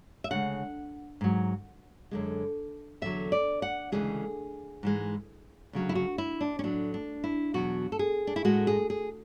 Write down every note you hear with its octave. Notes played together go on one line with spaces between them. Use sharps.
E5
D2 C#3 G#3 F#5
G#2 F#3
F#2 D3 G#3
E2 D3 F#3 E5
D5
F#5
D2 C#3 E3 G#3 G#4
G#2 E3 G#3
D2 C#3 F#3
E4
F#4
E4
D4
C#4
A2 F#3 D4
D4
E4
E2 B2 F#3 F#4
A4
G#4
D4
E4
A2 G#3 F#4
G#4
G#4